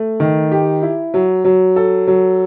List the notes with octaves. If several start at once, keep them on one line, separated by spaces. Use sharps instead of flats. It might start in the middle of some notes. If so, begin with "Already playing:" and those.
Already playing: A3
D#3
G4
E4
F#3
F#3
A4
F#3